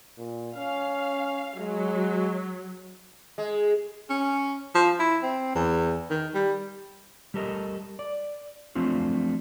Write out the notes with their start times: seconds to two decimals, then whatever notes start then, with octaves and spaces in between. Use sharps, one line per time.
0.18 A#2
0.56 C#4 F5
1.60 F#3 G#3
3.38 G#3
4.10 C#4
4.75 F3
4.99 E4
5.23 C4
5.55 E2
6.11 D#3
6.34 G3
7.34 G3 G4 A4 A#4 D#5
7.99 D5
8.75 F3 F#3 A3 C4 D4 F4